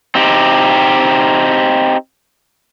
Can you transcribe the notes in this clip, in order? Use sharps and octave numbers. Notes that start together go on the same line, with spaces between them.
C4 D#4 G4